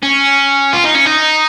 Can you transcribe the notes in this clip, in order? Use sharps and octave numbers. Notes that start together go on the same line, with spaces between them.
C#4
F4
D#4
C#4
D#4